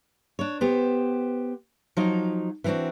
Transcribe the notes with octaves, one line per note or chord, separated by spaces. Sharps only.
D4 C#5
B3 G4 C5
F3 F#3 D#4
E3 B3 C4 D4 F#4